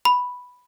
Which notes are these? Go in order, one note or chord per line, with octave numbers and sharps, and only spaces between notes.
B5